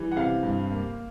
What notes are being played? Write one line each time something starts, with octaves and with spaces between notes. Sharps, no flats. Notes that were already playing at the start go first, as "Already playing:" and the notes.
Already playing: E3 G3
F#5
C3 F5
G2
A#3